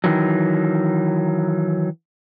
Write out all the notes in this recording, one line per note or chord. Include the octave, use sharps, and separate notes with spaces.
D#3 E3 F#3